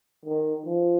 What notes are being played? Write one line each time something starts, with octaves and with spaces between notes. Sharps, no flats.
D#3
F3